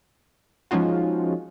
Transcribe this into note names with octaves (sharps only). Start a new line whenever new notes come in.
F3 G#3 C#4 D#4 F4 F#4